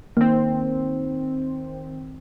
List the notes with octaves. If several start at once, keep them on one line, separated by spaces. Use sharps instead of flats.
D#3 A#3 C4